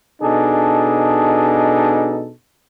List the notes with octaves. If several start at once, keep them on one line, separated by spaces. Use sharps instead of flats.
B2 D4 D#4 G#4 A4